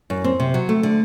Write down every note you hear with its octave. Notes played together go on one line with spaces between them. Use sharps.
F#2
C4
C3
F#3
A3
D3